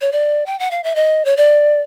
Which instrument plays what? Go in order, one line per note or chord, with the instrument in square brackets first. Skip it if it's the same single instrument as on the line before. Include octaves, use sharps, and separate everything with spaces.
[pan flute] C#5
D5
G5
F#5
F5
E5
D#5
C#5
D5